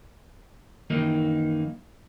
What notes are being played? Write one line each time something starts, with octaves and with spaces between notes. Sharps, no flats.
F#2 D#3 E3 A#3 D#4